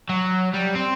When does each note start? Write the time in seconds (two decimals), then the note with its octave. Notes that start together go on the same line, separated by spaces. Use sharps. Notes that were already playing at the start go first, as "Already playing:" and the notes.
0.09 F#3
0.53 G3
0.75 C4